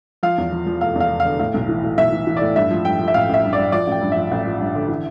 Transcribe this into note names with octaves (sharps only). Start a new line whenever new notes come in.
F3 F5
E2
F3
F3
F1 F5
E2 F5
F1
F5
D3
A2 F5
B1
E3
A2
B1 E5
E3
E3
A2 D5
G2 E5
F3
G2 G5
F3
E5
A1 F5
A1 E5
G2
D5
G2
F3 D5
A1 G5
G2
F3 E5
A1
F3
G2
D3
E3